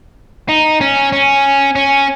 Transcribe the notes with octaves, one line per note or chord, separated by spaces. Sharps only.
D#4
C#4
C#4
C#4